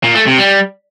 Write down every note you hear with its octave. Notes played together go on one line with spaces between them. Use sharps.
A#2
A3
C3
G3